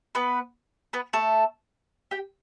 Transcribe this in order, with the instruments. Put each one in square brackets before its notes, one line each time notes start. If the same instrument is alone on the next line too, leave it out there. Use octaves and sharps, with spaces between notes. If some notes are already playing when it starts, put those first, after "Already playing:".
[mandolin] B3 B4
B3 B4
A3 A4
G4 G5